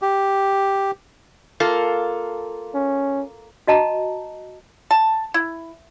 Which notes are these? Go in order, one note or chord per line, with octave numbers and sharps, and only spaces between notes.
G4
A#3 F4 A4
C#4
F#4 D#5 A5 A#5
A5
E4